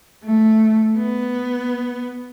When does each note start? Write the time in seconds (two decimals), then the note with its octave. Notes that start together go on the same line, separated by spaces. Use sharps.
0.24 A3
0.97 B3